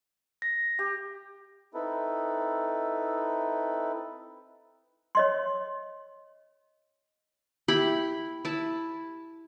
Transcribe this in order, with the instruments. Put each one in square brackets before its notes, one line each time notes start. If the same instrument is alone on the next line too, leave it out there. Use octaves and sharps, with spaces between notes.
[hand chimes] A#6
[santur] G4
[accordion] C4 D#4 E4 A4 B4
[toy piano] C#5 D#5 C6
[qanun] E4 G4 B5
E4 A5